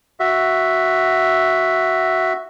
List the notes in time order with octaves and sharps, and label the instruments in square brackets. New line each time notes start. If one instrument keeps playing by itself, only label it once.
[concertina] F#4 E5